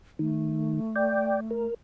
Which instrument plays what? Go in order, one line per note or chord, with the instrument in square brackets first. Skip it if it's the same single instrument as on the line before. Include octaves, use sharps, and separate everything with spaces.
[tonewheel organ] D#3 [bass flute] A3
[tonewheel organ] D5 G5
A#4